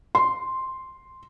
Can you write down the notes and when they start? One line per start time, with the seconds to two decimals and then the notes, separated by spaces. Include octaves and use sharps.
0.15 C6